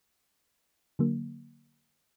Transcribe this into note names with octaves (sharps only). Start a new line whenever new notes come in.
D3 F#3 A#3